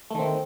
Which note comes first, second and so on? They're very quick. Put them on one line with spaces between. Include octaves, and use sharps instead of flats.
A3 D#3 C4